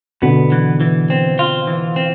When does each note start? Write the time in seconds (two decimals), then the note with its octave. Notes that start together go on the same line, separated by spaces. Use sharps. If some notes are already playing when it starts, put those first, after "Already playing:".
0.22 B2 D3 B3
0.52 E3
0.81 E3
1.10 C4
1.39 F4
1.67 E3
1.96 C4